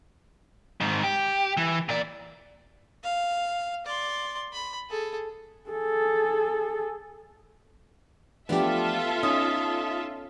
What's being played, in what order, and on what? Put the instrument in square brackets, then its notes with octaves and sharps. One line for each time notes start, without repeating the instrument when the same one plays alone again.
[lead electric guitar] G#2 D#3
G4
E3
A#2 D5
[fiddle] F5
D5 C6
B5
G#4 A4
[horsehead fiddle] G#4 A4
[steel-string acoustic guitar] F3 A3 D4 [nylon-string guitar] B3 G4 [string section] F4 A4 E5
[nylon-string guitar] C#4 [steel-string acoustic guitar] D#4 [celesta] D#6